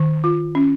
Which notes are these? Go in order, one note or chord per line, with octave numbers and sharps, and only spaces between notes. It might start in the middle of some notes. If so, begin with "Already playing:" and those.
Already playing: D#3
F4
C#4